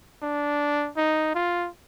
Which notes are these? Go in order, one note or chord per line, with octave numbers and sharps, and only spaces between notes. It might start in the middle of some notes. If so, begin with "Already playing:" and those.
D4
D#4
F4